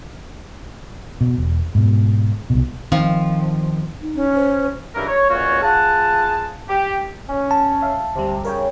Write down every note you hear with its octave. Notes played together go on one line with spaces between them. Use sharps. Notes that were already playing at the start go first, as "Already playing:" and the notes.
B2
E1
G#2 B2
C2 B2
D#3 F3 C4
D#4
C#4
C5
C#2 G2 E3 A#4
C#5
C#2 A#2 C#4 F4 F#4 C#5
F4 G#4 F#5 A5
G4
C#4
A5
E5 F5
D2 C3 G3
C#3 A#4 C#5 G5